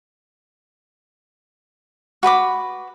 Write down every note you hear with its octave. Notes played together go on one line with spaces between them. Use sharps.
F#4 B4 B5 D6